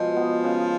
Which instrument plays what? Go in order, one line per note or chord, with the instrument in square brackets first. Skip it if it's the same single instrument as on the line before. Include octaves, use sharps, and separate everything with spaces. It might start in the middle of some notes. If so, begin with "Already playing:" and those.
Already playing: [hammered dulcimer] B2 G#3 [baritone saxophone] F3
[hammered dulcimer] B3
C#3